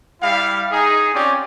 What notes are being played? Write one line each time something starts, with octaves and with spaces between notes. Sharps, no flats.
G3 E4 F5
D#4 G#4
C4 C#4 F4 G4 D5